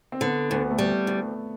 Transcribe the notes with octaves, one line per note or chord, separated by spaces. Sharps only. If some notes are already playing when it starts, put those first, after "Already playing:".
C4
D3 B3
D2 B3
A3
G3 B3
D2